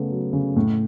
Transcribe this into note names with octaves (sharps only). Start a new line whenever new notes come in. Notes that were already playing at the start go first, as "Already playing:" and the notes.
Already playing: C#3 A3 B3
F#3
C#3
A2